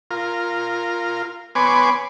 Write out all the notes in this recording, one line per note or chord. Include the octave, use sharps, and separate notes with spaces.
F4 A#4
B3 B4 C#5 G#5 C6 D6